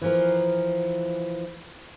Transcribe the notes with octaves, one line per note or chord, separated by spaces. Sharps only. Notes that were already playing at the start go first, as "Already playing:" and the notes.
E3 F3 A#4